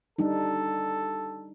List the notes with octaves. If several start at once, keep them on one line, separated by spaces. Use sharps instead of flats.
G3 D4 D#4 A4